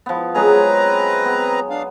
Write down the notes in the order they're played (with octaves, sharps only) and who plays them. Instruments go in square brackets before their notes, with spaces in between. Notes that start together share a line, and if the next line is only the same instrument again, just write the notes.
[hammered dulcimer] F3 B3
[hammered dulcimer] F#3 G#3 G#4 [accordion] C4 B4 A#5
[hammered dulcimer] B3
[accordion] D4 F5